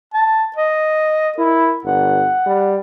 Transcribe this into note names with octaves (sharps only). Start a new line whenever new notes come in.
A5
D#5
E4 A#4
G1 F#5
G3